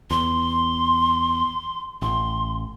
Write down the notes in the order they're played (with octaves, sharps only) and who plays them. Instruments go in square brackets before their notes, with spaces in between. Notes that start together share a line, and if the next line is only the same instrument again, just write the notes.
[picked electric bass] E2 [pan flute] C6
[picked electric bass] A1 [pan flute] C6